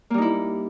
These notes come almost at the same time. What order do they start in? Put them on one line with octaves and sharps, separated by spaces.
A#3 G3 D#4 E4